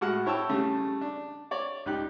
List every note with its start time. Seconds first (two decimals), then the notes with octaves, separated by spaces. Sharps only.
0.01 A2 G#3 F#4 F#5 F6
0.26 E4 C#5 G5 A5 E6
0.49 C#3 G3 A3
1.01 D4
1.51 C#5 D5
1.86 C#2 D#4 G4 F#6